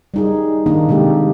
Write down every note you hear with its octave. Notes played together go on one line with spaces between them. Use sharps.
G3 D#4 G#4
D#3 A#3 D4 D#4
C3 G#3 D4 G4 A4